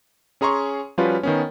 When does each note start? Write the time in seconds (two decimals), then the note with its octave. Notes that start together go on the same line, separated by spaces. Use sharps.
0.41 C#4 G#4 A#5 C6 C#6
0.98 F3 G3 C#4 F4 F#4 B4
1.23 D#3 B3 C#4